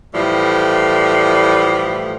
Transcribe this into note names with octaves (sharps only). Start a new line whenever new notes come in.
A2 E3 F3 G3 A3